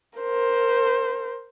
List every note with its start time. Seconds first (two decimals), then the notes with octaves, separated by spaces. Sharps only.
0.19 A#4 C5